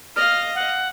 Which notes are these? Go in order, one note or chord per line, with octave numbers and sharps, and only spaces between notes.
D#5 F5 F6
F#5